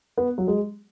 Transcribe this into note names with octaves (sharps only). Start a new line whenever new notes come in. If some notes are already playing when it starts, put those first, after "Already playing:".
B3
F#3
G#3